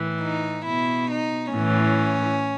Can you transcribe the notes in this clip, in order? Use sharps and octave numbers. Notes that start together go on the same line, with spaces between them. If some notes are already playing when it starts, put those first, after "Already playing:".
Already playing: A2 E3
D#4
B2 E4
D#4
A2 E3 C#4